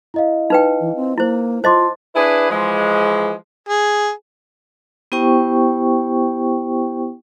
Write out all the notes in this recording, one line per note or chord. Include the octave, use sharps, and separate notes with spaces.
E4 D#5 F5
D#4 B4 G5
E3
C4
A#3 E4 C5
F4 C5 D#5 A5 C6 D6
D4 E4 G#4 B4
E3 F3 G#3
G#4
B3 E4 G4 C5 G5 C#6